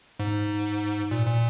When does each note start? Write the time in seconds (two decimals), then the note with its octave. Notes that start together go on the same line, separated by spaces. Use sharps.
0.20 G#2
1.11 A#2
1.26 A#2